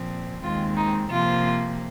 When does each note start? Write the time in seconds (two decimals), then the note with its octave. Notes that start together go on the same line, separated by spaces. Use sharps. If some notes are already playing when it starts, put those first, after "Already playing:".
Already playing: A#2 F3 C4
0.43 D#2 D#3 G#3 C4 F4
0.77 D#4
1.10 C3 F3 A#3 F4